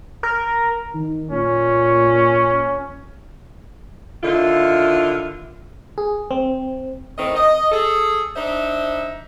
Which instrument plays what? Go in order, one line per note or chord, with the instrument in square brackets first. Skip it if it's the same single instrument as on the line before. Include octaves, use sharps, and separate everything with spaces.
[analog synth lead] A#4
[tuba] D#3
[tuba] A#2 [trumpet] C#4
[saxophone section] D3 D#3 E4 F4
[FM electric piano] G#4
C4
[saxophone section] A2 D#3 C4 D#5
D#5
G#4 A4
D4 D#4 C5 E5